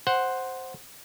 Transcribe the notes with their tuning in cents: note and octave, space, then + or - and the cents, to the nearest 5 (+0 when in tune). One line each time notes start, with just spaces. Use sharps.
C5 +0 F#5 +0